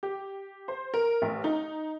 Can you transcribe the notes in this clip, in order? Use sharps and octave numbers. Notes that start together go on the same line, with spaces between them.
G4
C5
A#4
A1
D#4